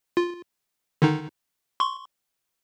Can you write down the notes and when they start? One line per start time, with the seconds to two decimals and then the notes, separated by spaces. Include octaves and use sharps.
0.17 F4
1.02 D3 D#3 D#4
1.80 C6 C#6